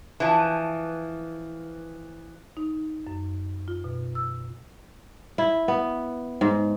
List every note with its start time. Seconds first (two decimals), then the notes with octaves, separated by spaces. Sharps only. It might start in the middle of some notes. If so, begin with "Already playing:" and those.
0.20 E3 F3
2.57 D#4
3.07 F#2
3.68 F4
3.84 B2
4.15 E6
5.38 E4
5.68 B3
6.41 G#2